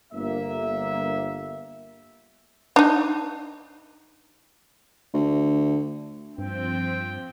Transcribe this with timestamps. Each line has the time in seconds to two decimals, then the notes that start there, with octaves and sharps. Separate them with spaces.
0.13 G1 A#3 E5
2.76 D4 D#4
5.14 D2
6.38 G2 F3 C4 G5